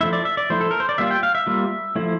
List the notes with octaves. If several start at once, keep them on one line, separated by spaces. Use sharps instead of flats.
F3 A3 E4 E5
D5
E5
D5
F3 A3 E4 C5
A4
A#4
C5
D5
G3 A#3 F4 E5
G5
F5
E5
G3 A#3 F4
F3 A3 E4